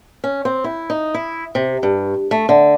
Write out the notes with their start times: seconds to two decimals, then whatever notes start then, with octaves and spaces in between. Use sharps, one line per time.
0.24 C#4
0.45 C4
0.64 E4
0.90 D#4
1.14 E4
1.55 C3
1.83 G2
2.31 A3
2.49 D3